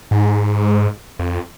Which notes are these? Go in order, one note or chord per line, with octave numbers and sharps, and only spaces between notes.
G#2
F2